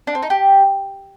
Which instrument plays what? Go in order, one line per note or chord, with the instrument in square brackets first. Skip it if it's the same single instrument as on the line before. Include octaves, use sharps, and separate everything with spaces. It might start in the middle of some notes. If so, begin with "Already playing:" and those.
[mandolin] D4
C4
D#4
G4